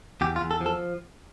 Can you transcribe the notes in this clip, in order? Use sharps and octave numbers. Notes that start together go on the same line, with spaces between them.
E2 G4
F4
E2
A4
F3
A4